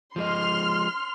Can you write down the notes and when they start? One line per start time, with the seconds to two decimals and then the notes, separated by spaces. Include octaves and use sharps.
0.16 F3 G#3 D#5 C6 F6